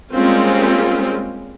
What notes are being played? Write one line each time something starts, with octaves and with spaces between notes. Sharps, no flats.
G3 G#3 A#3 C4 C#4 F4